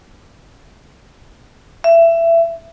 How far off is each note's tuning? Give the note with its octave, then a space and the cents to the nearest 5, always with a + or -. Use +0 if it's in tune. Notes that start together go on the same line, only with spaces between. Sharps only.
E5 +20